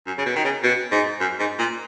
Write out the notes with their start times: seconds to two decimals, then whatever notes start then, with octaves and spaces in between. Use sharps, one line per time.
0.06 F#2
0.18 C#3
0.26 B2
0.36 D#3
0.44 C#3
0.63 B2
0.91 G#2
1.20 F#2
1.39 G#2
1.59 A#2